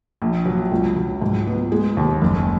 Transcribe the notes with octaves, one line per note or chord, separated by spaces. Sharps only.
A#1
F#3
C#2
F#3
G#2
B3
G#3
D#2
F#1